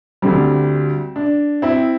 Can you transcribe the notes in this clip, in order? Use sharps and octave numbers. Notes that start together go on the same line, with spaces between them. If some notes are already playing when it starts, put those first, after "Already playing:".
D2 D3 G3 C4
D4
C4 E4